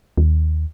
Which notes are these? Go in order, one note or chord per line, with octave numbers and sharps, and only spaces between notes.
D#2